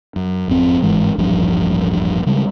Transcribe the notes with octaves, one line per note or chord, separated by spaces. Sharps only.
F#2
G#1 F2 C4
G1 G#2 E3 G#3
D#1 A1 G2 F3
C#3 G3 G#3